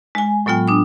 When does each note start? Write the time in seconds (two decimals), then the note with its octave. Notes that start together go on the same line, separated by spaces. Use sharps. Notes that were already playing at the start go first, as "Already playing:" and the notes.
0.15 G#3 G#5
0.46 A2 F#3 B3 F4 G5
0.68 D4 D#6